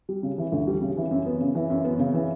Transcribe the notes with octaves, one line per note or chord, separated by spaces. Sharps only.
G3
C#3
E3
D2
G3
C#3
E3
F#2
B3
C#3
E3
F#2
B3
C#3
E3